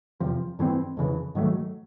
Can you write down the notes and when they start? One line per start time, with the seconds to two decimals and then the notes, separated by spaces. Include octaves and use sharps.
0.20 E2 C3 F3
0.59 G2 E3 A3 C4
0.97 F2 C#3 E3
1.35 G#2 D#3 F#3 A3